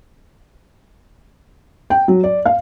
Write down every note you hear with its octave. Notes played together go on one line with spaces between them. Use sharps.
G5
F#3
D5
F5